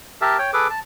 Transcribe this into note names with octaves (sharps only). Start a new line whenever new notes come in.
G4 A#4 E5 A5
C#5 G5
G#4 A4 B4 D6
A5